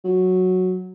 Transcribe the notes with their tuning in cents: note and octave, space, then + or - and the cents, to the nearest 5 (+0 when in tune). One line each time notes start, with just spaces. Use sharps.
F#3 -5